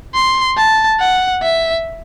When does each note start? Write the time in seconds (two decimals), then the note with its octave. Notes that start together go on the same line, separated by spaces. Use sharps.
0.14 C6
0.57 A5
1.00 F#5
1.43 E5